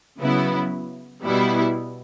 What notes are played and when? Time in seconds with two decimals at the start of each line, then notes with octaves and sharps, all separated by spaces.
0.18 C#3 F#3 B3 E4
1.24 B2 G3 B3 E4